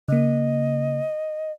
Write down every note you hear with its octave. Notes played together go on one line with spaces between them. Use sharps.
C#3 A#3 D#5